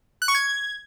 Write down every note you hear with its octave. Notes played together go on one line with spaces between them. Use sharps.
F#6
C#6
G#6